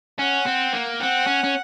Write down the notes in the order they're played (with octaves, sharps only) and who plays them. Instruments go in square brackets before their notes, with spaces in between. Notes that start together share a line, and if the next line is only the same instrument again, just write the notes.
[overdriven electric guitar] C#4 [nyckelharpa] F#5
[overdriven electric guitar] C4
A#3
[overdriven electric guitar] C4 [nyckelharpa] F#5
[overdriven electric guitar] C#4
C#4